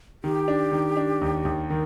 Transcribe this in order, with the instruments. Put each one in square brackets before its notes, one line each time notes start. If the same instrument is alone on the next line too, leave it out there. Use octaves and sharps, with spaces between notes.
[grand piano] D#3 [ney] G4
[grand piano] D4
D#3
D4
D#2
D#2
[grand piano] D#3 [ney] A#4